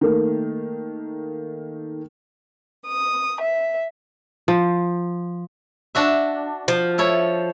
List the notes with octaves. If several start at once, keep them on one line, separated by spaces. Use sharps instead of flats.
D#3 A3 A#3
D#6
E5
F3
D4 F#4 E5
F3
E4 A4 C#5